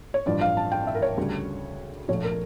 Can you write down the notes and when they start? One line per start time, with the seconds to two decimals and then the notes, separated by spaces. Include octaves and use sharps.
0.14 C#5
0.26 A1 G2 F3 D5
0.41 F5
0.57 A5
0.72 G5
0.87 E5
0.95 A#4
1.02 C#5
1.17 D2 C#3 G3
2.08 A#1 A#2 A3 C#5
2.24 A#4